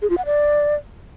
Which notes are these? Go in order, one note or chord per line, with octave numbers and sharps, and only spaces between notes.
G#4
F4
F#5
D5